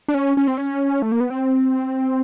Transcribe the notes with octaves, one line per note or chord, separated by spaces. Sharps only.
D4
C#4
C#4
C4
C#4
A3
A#3
B3
C4